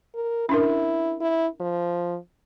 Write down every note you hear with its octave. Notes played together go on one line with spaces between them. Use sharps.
A#4
C#4 D4 E4 A#4
E4
F3